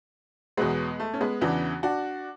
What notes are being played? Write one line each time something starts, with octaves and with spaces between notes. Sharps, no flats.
E2 B2 F#3 G#3 B3
A3
C#4
G#3 B3
E2 C#3 E3 D4 F#4
D4 F#4